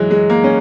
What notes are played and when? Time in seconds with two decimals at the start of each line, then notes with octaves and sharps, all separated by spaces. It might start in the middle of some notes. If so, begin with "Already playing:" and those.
Already playing: E3 F#3 G#3
0.11 G#3
0.30 A#3
0.44 C#4